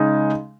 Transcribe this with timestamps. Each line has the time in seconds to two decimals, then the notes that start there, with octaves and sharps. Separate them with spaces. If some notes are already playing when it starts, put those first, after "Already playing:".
Already playing: C#3 G#3 D#4